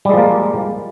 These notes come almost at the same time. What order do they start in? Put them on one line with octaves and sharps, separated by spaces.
G3 G#3 F3 A#3